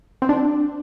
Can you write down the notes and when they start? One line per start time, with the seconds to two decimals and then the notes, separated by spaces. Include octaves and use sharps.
0.22 C4
0.29 D4